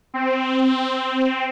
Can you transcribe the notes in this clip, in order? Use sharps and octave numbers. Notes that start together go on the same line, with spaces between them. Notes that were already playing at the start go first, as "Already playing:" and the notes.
C4